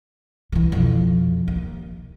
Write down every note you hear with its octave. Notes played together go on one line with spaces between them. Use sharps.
D#3 E3
F2 B2
D#2